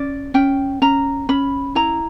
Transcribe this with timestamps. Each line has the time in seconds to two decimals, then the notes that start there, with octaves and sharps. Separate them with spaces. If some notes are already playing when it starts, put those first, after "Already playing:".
Already playing: C#4 D5
0.34 C#4 G5
0.82 C#4 A#5
1.29 C#4 B5
1.75 E4 A#5